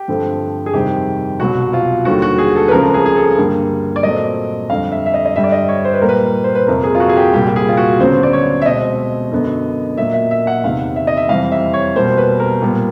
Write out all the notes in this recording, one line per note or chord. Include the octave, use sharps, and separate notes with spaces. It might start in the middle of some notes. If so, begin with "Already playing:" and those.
Already playing: G4
G2 D3 F3 A3 C4
G#4
F2 C3 D#3 G3 C4 G4
C2 B2 F#3 F#4
F4
D#2 D3 G3 F#4
F#4
G#4
A4
B4
C#2 C#3 F3 A3 C4 A#4
G#4
G#4
A4
G2 D3 G3 A#3
D5
A#2 F#3 A3 C4 D#5
F2 D3 G3 F5
E5
E5
D#5
D#5
G2 D3 G3 E5
D5
D#5
C#5
C5
B4
A#2 G3 A#3 A#4
B4
C5
B4
F2 C3 F3 A#3 A#4
G#4
F4
F#4
G#4
G4
C2 A#2 G3 G4
G4
G#4
F4
F#4
D2 C#3 F#3 B3 C5
D5
C#5
E5
B2 G#3 C4 D#5
F#2 D3 F#3 B3
A#2 F#3 A#3 E5
E5
E5
F#5
E2 C3 D#3 F5
E5
D#5
E5
F2 C3 E3 G3 C4 F5
E5
C#5
B2 G3 A#3 C5
B4
A#4
A#2 G3 B3